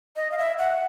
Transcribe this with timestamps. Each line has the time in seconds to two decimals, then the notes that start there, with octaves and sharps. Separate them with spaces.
0.16 D#5
0.32 F5
0.38 E5
0.58 F#5